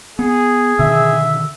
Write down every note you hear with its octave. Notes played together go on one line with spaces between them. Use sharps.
B3 G#4
B2 D3 D#3 E5